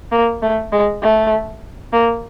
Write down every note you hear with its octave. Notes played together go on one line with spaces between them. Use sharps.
A#3
A3
G#3
A3
A#3